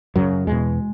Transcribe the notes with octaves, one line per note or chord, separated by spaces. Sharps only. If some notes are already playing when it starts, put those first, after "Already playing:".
F#2 C#3 F#3
E2 B2 G#3